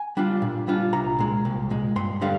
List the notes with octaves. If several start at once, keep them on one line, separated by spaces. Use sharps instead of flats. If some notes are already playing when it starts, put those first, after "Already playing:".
Already playing: G#5
G3 D4 F4
A#2
G3 D4 F4
C2 A#5
A#2 G#3
C2
A#2 G#3
G2 C6
D3 G3 F5